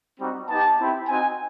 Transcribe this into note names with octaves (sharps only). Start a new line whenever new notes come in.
G3 C4 D#4 F#4
B3 D#4 G4 A5
C4 E4 G4
C4 D#4 F#4 G#5